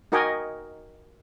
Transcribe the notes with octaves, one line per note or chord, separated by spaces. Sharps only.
D#4 F#4 A#4 D#5 G5 G#5